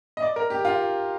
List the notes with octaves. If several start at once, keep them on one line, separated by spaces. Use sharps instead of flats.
D#5
D5
A#4
G4
F4